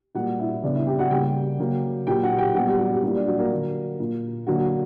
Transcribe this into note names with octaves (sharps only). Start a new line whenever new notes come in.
A#2 G3 A#3 F#4 F#5
E4 E5
C#3 G3 B3 D4 D5
E4 E5
G4 G5
F#4 F#5
C#3 G3 A#3 G4 G5
C#3 F#3 A#3
A#2 F#3 A#3 G4 G5
F#4 F#5
G4 G5
A#2 G3 B3 F#4 F#5
G3 G4
F#3 F#4
G3 G4
A#2 G3 A#3 E4
D4
F#3 F#4
A#3 A#4
D3 F#3 A#3
A#2 A#3
D3 F#3 A#3 F#4